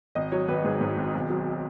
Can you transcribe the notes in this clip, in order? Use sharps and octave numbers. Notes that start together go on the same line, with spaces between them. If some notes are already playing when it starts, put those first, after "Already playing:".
G#1 D#5
F#3 C#5
G#1 B4
G#2 G#4
G#2
G#1
B1
F#3